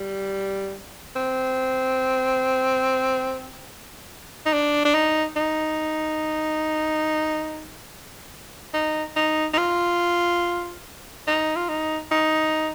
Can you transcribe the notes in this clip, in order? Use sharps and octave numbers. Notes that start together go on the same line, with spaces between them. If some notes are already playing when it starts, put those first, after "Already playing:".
Already playing: G3
C4
D#4
D4
D4
D#4
D#4
D#4
D#4
D#4
F4
D#4
F4
D#4
D#4